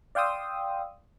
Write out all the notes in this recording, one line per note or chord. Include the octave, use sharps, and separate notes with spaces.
D5 F5 G5 C6 D#6 E6